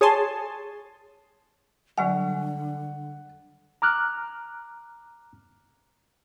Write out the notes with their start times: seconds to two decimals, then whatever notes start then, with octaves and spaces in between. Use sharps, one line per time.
0.01 G#4 C#5 G#5 A5 C6
1.98 D3 F#3 G3 F#5 G#5
3.82 A#5 D6 F6 F#6